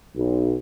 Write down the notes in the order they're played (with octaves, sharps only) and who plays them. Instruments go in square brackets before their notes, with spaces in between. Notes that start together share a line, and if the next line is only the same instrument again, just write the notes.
[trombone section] B1